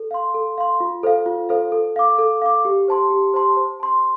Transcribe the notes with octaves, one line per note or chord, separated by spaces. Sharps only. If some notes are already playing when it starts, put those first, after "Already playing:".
Already playing: A4
F5 C6
A4
F5 C6
F4
A4 C5 F5
F4
A4 C5 F5
A4
F5 D6
A4
F5 D6
G4
C5 A5 C6
G4
C5 A5 C6
C5
A5 C6